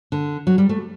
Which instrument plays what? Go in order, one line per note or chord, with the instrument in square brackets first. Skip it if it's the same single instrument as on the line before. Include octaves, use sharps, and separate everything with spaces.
[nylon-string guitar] D3
F#3
G3
A3